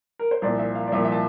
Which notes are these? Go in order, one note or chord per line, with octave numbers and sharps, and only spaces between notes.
A#4
C5
C2 A#2 F3 D5
E5
F5
D5
C2 A#2 F3 E5
E5
A5